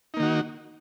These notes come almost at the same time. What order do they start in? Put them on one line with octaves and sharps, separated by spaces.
D#4 A#3 D#3 F#4